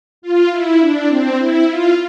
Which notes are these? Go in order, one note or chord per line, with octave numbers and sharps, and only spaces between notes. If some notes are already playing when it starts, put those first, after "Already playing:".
F4
E4
D4
C4
E4
F4